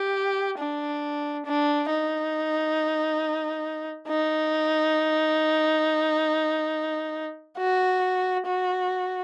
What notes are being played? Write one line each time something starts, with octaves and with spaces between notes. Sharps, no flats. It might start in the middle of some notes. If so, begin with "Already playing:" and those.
Already playing: G4
D4
D4
D#4
D#4
F#4
F#4